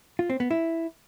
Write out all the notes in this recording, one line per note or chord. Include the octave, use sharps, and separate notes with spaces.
F4
C4
B3
E4